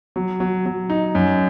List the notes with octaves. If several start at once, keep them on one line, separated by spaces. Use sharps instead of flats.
F#3
F#3
F#3
D#4
F#2